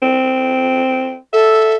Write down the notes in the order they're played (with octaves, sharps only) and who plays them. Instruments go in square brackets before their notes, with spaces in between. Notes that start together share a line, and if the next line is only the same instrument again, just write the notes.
[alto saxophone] C4
[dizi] A4 [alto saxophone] E5